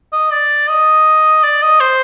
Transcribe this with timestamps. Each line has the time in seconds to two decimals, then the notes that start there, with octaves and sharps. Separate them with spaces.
0.13 D#5
0.31 D5
0.68 D#5
1.43 D5
1.62 D#5
1.81 C5